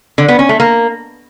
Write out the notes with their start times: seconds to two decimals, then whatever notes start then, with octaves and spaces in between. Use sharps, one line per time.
0.18 D3
0.28 B3
0.39 C#4
0.49 A3
0.60 A#3